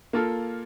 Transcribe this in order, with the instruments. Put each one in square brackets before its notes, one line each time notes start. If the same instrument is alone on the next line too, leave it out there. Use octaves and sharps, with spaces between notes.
[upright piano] A#3 F4 A4